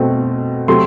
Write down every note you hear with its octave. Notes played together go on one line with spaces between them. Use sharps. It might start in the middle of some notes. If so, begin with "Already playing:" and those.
Already playing: B2 A3 C4
C3 F#3 A3 C4 C6